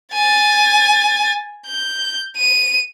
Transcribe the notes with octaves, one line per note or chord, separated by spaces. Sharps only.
G#5 A6
G6
D#7